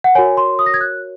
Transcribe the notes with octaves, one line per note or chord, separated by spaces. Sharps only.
F#5
F#4 A#4 C#5 G#5
C6
D#6
A#6
G#6
F#6